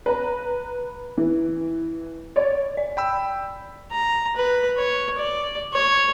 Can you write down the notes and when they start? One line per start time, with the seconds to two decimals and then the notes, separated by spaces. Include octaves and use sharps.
0.06 B4 A#5
1.17 E3
2.36 C#5 D5
2.77 D5
2.97 G5 B5 E6
3.91 A#5
4.36 B4
4.78 C#5
5.18 D5
5.73 C#5